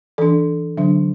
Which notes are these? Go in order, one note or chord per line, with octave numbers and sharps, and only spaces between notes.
E3 D4 A4
D3 F#3 D4